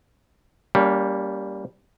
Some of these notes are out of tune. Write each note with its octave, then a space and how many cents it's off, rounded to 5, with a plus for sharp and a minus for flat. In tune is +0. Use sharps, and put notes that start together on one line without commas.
G3 +0 A#3 +0 C#4 +35